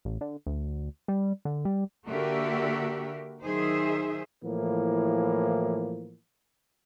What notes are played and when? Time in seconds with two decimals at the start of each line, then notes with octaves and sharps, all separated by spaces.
0.05 A1
0.21 D3
0.46 D2
1.08 G3
1.45 D3
1.65 G3
2.08 D3 A#3 F#4 G4 A#4 E5
3.44 D#3 F#3 D#4 G#4 C5 E5
4.42 A2 E3 F3 A#3